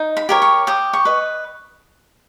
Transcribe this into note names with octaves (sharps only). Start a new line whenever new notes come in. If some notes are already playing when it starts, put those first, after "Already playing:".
Already playing: D#4
B5
G4 A#4 C#5
C#6
G4 D#6
C#6
B4 D#5